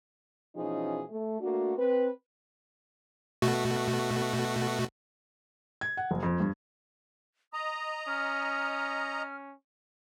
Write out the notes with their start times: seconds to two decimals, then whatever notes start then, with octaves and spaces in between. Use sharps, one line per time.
0.56 B2 E3 F3 C#4 D#4 G#4
1.10 A3
1.40 A3 A#3 D4 F#4
1.78 C4 B4
3.42 B2 A3 F#4
5.81 G#6
5.97 F#5
6.11 F#1
6.23 F2
6.40 G2
7.53 D#5 A#5 D#6
8.08 C#4 F6